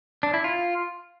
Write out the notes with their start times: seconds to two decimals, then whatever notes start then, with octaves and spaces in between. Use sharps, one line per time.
0.23 D4
0.34 E4
0.44 F4